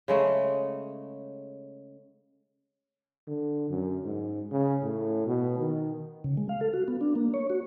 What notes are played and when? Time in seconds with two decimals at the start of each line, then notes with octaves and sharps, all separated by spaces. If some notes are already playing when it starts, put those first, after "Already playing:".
0.08 C#3 G#3 A3
3.27 D3
3.69 F#2
4.04 G#2
4.51 C#3
4.83 A2
5.27 B2
5.58 D#3
6.24 C#3
6.37 G#3
6.49 F5
6.61 A4
6.73 F#4
6.88 B3
7.01 D4
7.15 A#3
7.34 C#5
7.50 F#4